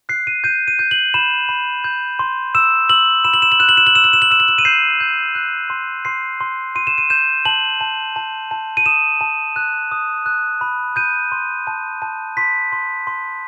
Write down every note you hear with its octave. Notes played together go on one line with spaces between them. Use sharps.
F#6 C7
D#7
G6 D#7
D#7
G6
F#7
B5 E7
B5
G6
C6
E6 E7
E6 F#7
B5 E7
F#7
E7
F#7
F#6 E7
F#7
E7
F#7
E6 E7
F#7
E7
F#7
E6 E7
F#7
E7
D#7
G6 C7
G6
F#6
C6
C6 C7
C6
C6 D#7
E7
D#7
G6 E7
A5 F#7
A5
A5
A5
D#7
D#6 E7
A5
F#6
D#6
F#6
B5
G6 D#7
C6
A5
A5
C6 B6
C6
C6